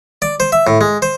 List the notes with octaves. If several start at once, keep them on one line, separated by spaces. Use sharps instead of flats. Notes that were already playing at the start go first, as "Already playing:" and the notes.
D5
C5
E5
A2
G#3
C5